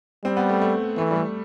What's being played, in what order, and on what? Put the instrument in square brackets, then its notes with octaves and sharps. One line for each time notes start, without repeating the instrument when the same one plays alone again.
[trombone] G3 [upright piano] C4
[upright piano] B3
A3
A3
[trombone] E3 [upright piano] A3
[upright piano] G3
A3